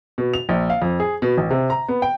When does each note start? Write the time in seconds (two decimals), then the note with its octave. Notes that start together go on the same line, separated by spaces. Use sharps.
0.18 B2
0.34 F7
0.49 A#1
0.70 F5
0.82 F2
1.00 G#4
1.22 B2
1.37 A1
1.50 C3
1.70 A#5
1.89 B3
2.02 G5